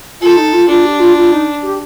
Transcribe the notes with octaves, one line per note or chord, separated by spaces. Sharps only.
F4 A4
D#4
F4
D4 F4
G4
F4
F4
D#4
G4